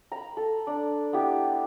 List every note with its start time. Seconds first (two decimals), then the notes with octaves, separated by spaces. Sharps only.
0.12 A#5 B5
0.37 A4
0.67 D4
1.13 B3 E4 G4